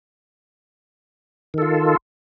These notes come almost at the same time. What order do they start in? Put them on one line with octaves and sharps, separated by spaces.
D#3 A4 F4